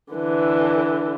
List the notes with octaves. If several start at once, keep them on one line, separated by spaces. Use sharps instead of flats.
D3 E3